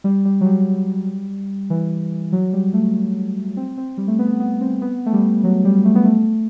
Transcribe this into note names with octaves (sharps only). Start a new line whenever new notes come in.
G3
G3
F#3
G3
E3
F#3
G3
A3
C4
C4
G3
A3
B3
B3
C4
B3
A3
G3
F#3
G3
A3
B3
A3